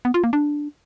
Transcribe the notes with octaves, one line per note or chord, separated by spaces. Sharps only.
B3
F4
A#3
D4